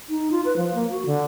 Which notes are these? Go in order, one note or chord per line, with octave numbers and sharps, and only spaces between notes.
D#4
F4
B4
F3
A#3
F#4
D3